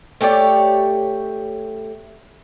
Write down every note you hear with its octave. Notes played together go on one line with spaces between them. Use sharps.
A3 G4 C#5 D5